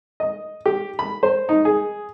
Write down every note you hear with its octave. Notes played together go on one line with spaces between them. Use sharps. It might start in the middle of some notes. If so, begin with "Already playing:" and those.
D#5
G4
B5
C5
D#4
G#4